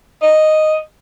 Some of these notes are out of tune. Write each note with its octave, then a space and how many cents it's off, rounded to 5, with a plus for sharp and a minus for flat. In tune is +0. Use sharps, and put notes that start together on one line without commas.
D#5 -5